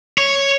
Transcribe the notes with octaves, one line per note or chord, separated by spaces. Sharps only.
C#5